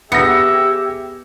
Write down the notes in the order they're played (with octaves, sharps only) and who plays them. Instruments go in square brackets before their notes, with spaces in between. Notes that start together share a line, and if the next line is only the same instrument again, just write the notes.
[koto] B3 [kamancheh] G4 G#4 [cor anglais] E5 [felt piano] A#6 C#7